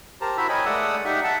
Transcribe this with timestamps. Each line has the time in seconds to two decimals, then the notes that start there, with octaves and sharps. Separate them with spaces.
0.21 G4 A#4 C5 A5 A#5
0.38 E4 F#4 C5 E5 B5 E6
0.49 A#4 C#5 D#5 G5 G#5 B5
0.66 G#3 A3 D5 F#5 D#6 E6
1.05 D#4 G4 E5 F#5
1.24 E5 F#5 A5